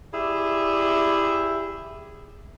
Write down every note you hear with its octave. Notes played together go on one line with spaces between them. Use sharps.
E4 G4 G#4 D5 E5